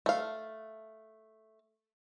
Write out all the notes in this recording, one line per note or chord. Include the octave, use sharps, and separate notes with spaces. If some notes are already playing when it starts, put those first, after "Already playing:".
A3 F5